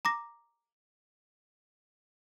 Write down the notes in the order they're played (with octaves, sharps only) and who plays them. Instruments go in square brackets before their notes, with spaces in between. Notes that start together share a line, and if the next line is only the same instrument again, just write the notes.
[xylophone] A#5 D6 A#6